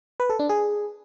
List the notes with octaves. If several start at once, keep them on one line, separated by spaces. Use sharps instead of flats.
B4
A4
D4
G#4